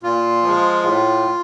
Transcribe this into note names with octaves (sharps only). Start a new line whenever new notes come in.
A#2 F4
F3 G#3
A2